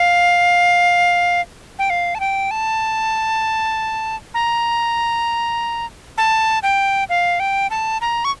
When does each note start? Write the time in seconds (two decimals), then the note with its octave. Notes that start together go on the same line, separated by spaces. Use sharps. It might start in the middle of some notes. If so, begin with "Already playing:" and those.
Already playing: F5
1.79 G5
1.90 F5
2.15 A5
2.20 G5
2.51 A5
4.34 A#5
6.18 A5
6.63 G5
7.09 F5
7.40 G5
7.70 A5
8.01 A#5
8.25 C#6